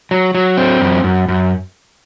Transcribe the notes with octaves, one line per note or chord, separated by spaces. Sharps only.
F#3
F#3
C4
F#2
F#2
F#2